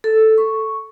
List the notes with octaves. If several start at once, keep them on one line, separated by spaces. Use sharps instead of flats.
A4
C#6